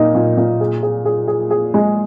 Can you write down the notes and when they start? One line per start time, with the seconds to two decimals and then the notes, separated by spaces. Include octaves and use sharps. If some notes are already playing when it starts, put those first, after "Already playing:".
Already playing: A#2 A#3 D#4
0.15 A#2
0.37 A#2
0.61 G#4
0.83 G#4
1.05 G#4
1.28 G#4
1.51 G#4
1.74 G#3